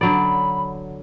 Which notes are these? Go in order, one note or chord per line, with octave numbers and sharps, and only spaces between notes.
D3 F#3 D5 B5